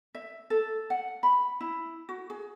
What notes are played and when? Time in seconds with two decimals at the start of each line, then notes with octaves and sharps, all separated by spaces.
0.15 E5
0.50 A4
0.90 F#5
1.23 B5
1.61 E4
2.09 F#4
2.30 G#4